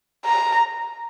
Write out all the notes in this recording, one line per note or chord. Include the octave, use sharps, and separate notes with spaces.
A#5